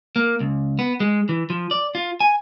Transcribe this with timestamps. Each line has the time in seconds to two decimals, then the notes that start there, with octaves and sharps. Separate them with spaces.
0.16 A#3
0.40 C#2
0.79 B3
1.00 G#3
1.29 E3
1.50 F3
1.71 D5
1.95 F4
2.20 G#5